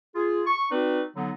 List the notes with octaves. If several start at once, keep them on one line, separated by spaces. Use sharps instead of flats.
F4 G#4
C#6
C4 D#4 F#4 B4 D5
D3 F#3 B3 D#4